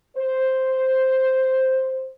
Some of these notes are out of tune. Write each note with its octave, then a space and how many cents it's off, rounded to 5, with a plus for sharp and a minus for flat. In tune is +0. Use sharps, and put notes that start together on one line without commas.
C5 +0